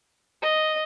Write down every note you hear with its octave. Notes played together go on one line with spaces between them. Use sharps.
D#5